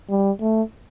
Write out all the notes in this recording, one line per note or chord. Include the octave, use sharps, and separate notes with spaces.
G3
A3